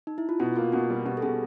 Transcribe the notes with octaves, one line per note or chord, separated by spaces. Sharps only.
D#4
E4
F4
B2 F#4
A#3 F4
B2 F#4
G3
B2 G4
A4
B2 G#4